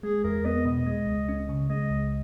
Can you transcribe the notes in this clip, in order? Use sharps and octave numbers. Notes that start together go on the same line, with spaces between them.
G#3 G#4
E2 A#4
B3 D#5
B2 D#5
G#3
C#2
C#4
C#3
G#3 D#5
C#2